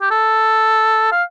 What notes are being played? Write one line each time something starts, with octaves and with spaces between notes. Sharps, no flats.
G4
A4
F5